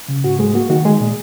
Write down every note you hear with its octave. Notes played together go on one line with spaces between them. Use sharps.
C#3
G#2 F#4
G#2 G#3 G#4
A#3 F#4
D#3 F#4
G#3 G#4
A#2